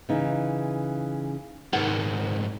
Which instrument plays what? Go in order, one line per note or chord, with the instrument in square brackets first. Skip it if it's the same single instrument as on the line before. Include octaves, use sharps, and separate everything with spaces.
[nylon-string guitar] C#3 E3 D#4
[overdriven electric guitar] C2 G#2 [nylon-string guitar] D#3 F#5